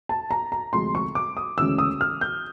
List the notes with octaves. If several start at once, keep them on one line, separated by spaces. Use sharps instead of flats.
A5
A#5
A#5
D2 C3 F3 G#3 C6
C#6
D6
D#6
D2 C#3 E3 G#3 C#4 E6
D#6
F6
G6